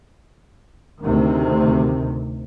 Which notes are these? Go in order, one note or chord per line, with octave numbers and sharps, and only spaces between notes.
D2 C3 D#3